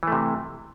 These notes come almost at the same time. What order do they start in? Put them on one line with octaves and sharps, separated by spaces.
E3 A3 C3